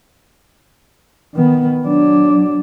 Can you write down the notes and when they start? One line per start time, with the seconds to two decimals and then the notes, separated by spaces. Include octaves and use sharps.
1.34 D#3 B3
1.86 F#3 D4